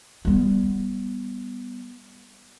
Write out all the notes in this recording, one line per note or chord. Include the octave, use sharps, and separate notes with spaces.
G3 B3